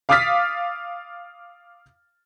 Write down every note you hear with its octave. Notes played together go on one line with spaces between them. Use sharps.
F5 D6 D#6 F6 A6 B6